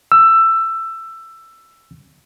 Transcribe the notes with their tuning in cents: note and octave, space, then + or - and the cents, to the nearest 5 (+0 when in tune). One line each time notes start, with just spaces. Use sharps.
E6 +15